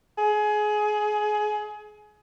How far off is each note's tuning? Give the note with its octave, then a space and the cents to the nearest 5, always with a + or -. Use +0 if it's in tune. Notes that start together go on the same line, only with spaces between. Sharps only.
G#4 +25